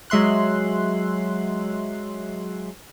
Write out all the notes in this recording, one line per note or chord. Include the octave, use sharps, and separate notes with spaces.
F#3 G#3 E5 C6 F#6